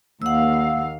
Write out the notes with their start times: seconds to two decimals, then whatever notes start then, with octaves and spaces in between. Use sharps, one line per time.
0.22 D#2 F5 F#5 E6